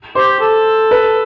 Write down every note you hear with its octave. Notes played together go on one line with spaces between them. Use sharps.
G4 C5
A4
B4